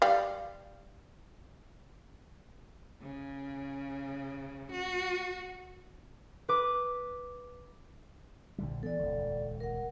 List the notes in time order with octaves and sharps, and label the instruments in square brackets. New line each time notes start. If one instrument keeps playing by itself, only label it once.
[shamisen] G3 F5
[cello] C#3
F#4
[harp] B4 D6
[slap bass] A#1 D3 G3
[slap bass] E3 B3 [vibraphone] A4 D5
[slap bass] D#1 C#2
[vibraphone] A#4 F#5